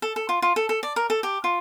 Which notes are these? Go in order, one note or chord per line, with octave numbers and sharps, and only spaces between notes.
A4
A4
F4
F4
A4
A4
D5
A#4
A4
G4
F4